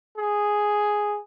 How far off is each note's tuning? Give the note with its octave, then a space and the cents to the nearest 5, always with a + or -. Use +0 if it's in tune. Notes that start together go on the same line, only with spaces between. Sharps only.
G#4 +0